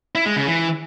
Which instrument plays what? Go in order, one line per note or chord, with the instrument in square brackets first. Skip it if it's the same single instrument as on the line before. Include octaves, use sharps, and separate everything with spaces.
[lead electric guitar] E4
G#3
C#3
E3